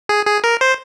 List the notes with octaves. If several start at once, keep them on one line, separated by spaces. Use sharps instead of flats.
G#4
G#4
A#4
C5